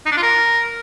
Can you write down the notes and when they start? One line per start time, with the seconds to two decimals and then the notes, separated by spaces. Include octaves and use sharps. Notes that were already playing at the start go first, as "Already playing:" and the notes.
0.06 D#4
0.12 D4
0.17 F4
0.23 A#4